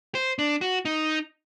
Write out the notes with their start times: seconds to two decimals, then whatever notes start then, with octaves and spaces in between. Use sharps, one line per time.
0.15 C5
0.39 D4
0.61 F#4
0.85 D#4